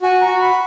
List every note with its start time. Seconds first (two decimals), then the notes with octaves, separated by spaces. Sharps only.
0.02 F#4 G#5
0.21 A#5
0.27 F#4
0.41 B5